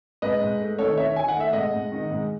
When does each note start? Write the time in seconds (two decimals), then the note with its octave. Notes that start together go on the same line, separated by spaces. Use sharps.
0.22 G#2 B4 D#5
0.41 G#2
0.60 A3
0.79 D#3 A4 C#5
0.97 D#3 C#5 E5
1.16 D#3 G#5
1.28 F#5
1.36 A3 E5
1.53 G#2 D#5 F#5
1.73 G#2
1.92 D#3
2.11 G#2